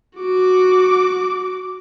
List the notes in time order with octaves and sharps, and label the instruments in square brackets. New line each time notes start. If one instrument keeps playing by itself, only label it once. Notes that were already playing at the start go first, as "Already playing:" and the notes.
[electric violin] F#4 D6